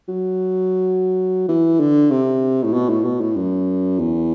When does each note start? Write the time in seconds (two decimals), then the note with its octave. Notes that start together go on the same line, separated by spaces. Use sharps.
0.09 F#3
1.48 E3
1.80 D3
2.11 C3
2.64 A2
2.73 B2
2.89 A2
3.05 B2
3.21 A2
3.36 F#2
3.99 E2